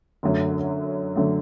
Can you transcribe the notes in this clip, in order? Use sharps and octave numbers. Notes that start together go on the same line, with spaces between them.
F#2 D3 F#3 A3
D3 F#3 A3